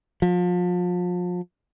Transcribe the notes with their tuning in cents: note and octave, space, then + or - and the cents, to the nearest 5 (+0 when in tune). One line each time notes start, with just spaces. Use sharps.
F3 +35